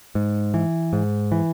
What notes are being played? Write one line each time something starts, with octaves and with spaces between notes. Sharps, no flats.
G#2
E3
G#2
E3